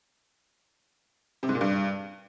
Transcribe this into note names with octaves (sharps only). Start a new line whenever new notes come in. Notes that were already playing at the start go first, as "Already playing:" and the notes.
C3
G#2
A#2
G2